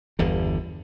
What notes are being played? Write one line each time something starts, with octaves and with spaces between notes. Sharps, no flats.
G1 E2 D3